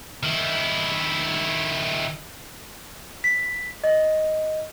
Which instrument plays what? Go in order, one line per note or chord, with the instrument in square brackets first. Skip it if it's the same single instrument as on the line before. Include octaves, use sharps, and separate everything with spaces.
[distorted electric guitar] D#3 E4
[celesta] B6
D#5